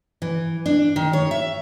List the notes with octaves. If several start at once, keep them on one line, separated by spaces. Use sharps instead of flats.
E3
D4
D#3
C#5
E5